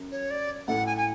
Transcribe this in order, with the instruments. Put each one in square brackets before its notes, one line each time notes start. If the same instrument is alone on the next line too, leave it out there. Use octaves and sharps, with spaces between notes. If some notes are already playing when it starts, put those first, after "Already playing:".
Already playing: [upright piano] F#2
[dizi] C#5
D5
[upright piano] A2 A3 [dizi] F#5
[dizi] G#5
G#5